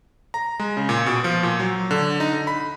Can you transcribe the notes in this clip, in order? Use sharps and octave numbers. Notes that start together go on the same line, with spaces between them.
A#5
G#3
C#3
A#2
B2
F3
A#2
F#3
D3
D#4
D3
B5